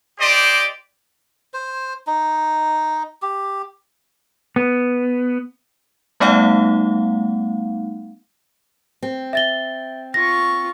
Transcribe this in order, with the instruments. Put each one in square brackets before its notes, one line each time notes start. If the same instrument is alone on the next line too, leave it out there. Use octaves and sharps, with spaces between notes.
[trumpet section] G4 C5 D5 D#5
[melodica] C5
D#4
G4
[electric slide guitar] B3
[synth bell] G3 A3 B3 D#4 F5 F#5
[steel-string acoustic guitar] C4
[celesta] E5 A6 G7
[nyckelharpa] F4 C#6 [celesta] A#6